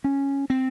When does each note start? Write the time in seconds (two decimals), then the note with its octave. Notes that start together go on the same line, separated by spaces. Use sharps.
0.04 C#4
0.50 C4